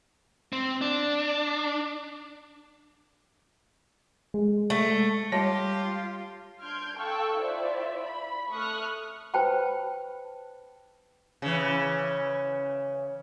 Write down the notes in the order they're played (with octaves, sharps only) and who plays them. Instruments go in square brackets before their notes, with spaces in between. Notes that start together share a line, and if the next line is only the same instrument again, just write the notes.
[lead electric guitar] C4
D4
[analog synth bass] G#3
[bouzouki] A3
[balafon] G3 [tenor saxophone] F4 [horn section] G4 [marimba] C#5 A5
[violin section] D4 C6 F6 G6 G#6 D7
A4 F5 G5 C#6 E6 F#6
E4 F4 C5 D5 E5
B5
A3 C#6 D#6 F6 F#6
[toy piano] B4 C5 G5 A5 B5
[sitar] C#3 E3